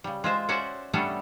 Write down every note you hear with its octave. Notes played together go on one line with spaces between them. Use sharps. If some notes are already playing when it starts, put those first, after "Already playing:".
C#3 G3
G#3 F4 C5 E5
C#4 F#4 C5 D5 E5 F#5
G3 A3 B3 C#4 D4 A4